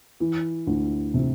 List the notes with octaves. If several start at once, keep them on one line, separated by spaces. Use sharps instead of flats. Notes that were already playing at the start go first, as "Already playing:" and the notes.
E3
D2
C3